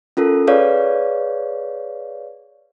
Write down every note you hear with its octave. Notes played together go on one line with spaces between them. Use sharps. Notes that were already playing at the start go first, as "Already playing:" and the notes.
C#4 F4 A4 A#4
G#4 B4 C#5 D5 F5